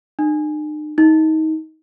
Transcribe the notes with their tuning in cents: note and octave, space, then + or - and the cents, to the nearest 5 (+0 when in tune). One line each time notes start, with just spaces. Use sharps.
D#4 -45
D#4 +25